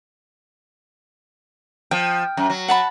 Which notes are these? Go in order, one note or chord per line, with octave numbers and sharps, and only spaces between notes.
F3 G5
F#2
F#3
F#5 A5 B5